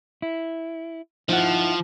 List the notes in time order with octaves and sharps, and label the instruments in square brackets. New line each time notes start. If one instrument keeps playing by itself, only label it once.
[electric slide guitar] E4
[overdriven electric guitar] F3 [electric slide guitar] D#4 E4 F#5